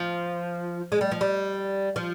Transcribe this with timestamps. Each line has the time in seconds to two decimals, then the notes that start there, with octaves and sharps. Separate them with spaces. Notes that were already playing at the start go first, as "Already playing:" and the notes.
Already playing: F3
0.92 G#3
1.01 G3
1.11 F3
1.21 G3
1.96 F3